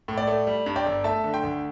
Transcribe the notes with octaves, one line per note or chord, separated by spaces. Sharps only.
A2
D5
A3
G3
G2
D5 G5
G1
A3 E5 A5
D3
G5 C6
D2